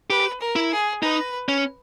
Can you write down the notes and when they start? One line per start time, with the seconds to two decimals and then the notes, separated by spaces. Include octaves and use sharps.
0.10 G4 B4
0.41 A#4
0.56 E4
0.71 G#4
1.03 D#4 B4
1.48 C#4